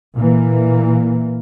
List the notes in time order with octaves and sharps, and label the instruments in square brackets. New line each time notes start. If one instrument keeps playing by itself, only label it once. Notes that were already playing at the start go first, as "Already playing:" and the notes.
[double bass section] A#2 E3 A#3